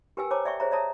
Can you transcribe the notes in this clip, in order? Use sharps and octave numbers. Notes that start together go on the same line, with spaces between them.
G4 A#4 B4 G5 G#5 E6
C5 C#5 G5 A5 A#5 D6
D5 E5 G5 C#6
G#4 C5 C#5 E5 A#5
C#5 D5 E5 A5 A#5 D#6